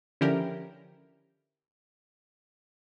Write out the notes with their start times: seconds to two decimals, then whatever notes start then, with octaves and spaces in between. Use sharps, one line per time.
0.21 D3 F3 C#4 E4 G4 A#4